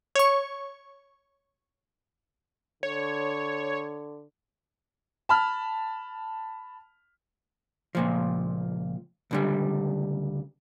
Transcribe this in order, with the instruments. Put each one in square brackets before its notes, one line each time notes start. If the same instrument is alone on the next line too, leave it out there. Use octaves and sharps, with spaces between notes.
[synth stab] C#5 C#6
[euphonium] D3 [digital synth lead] C#5
[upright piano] A5 B5 F6
[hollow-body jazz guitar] C#2 A#2 F3
C#2 D3 G3